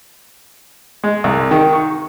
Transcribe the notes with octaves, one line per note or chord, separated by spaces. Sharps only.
G#3
C2
D#3
C#6